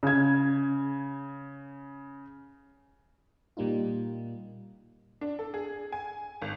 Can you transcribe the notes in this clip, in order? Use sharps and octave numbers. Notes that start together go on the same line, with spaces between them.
C#3 G#6
A#2 G3 A#3 D#4 F4
D4
A4
G#4
G#5
G#1